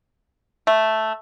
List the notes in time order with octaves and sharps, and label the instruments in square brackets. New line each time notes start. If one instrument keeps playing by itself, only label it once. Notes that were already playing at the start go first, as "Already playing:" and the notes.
[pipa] A3